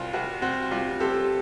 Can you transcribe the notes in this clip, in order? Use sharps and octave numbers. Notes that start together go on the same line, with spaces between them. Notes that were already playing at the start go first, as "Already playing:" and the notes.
Already playing: C2 C4 F4 F#4
C2 F#4
C4 F#4
G3 F4 G4
C4 G4 A4